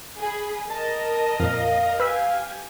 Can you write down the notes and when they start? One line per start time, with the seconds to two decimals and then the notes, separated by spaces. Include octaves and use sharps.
0.19 G#4 B5
0.70 A#4 D#5 A5
1.40 F2 A#2 F5
2.00 G4 B4 G#5 E6 B6